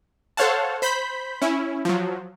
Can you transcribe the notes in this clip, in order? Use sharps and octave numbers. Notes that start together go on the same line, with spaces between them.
A4 C5 C#5 F5 F#5 A5
C5 B5 G6 B6
C#4 E4
F3 F#3